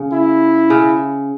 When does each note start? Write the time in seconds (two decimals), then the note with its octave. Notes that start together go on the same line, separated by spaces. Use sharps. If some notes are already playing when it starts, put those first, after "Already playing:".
Already playing: C#3
0.13 E4
0.70 C#3